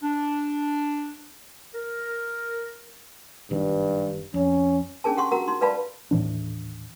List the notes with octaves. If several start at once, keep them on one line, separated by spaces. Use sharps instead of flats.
D4
A#4
F#1 G2 D#3
F2 C#4
C#4 D4 G#4 A#4 A5
G4 F#5 C6 C#6
F#4 A#4 F#5 A#5
D#4 C6
B4 D5 F5 A5 B5
D#1 A2 E3 D4